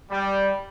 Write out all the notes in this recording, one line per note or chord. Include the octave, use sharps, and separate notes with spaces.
G3